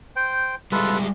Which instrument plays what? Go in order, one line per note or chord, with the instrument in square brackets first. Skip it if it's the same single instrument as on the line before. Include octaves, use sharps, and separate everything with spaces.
[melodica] C5 G5
[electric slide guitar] G3 G#3 E4 [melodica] F4 A4 B4